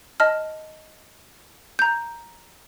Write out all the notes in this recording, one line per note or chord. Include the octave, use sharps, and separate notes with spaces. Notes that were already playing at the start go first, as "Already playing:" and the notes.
D#5 A5 F6
A#5 G6